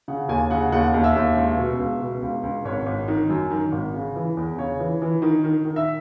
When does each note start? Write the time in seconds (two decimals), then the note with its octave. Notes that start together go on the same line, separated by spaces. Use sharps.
0.08 C#3 F#5
0.29 D#2 G#5
0.50 C#3 F#5
0.72 D#2 F#5
0.94 D#2
1.04 E5
1.15 D#2
1.37 C#2
1.58 B2
1.80 C#2
2.01 B2
2.22 C#2
2.43 C#2
2.65 G#1 C#5
2.86 G#1
3.08 D#3
3.29 F#2
3.51 D#3
3.72 G#1
3.94 C#3
4.16 E3
4.37 E2
4.58 C#3 C#5
4.80 E3
5.02 E3
5.22 D#3
5.44 D#3
5.65 D#3
5.76 E5